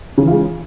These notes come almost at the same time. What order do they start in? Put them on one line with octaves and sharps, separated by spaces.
C#3 E3 F4 G#3